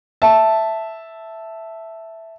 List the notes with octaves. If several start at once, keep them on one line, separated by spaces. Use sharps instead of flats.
E5 A5